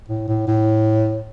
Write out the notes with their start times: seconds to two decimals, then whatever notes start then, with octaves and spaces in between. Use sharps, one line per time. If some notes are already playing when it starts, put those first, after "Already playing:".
0.09 A2
0.28 A2
0.48 A2